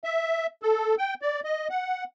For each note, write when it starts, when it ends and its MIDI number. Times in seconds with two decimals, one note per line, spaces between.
0.04 0.47 76
0.63 0.95 69
0.98 1.14 79
1.22 1.40 74
1.44 1.68 75
1.70 2.04 78